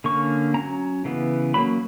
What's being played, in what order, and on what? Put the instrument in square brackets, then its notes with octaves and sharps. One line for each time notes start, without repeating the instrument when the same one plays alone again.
[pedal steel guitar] D3 A#3 C#4 C#6
F#3 C#4 A#5
C#3 E3 B3
F#3 A#3 C#4 B5